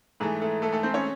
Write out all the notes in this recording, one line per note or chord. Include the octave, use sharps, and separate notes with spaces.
G#2 E3 A3 G#4
A3 A4
A3 A4
A3 A4
C4 C5
C#4 C#5